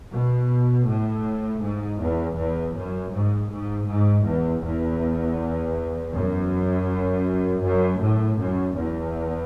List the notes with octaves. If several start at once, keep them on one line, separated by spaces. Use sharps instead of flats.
B2
A2
G#2
E2
E2
F#2
G#2
G#2
G#2
E2
E2
F#2
F#2
A2
F#2
E2